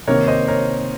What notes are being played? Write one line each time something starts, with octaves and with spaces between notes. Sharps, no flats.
C3 D#3 A#3 A#4 C#5
C5 D#5
A#4 C#5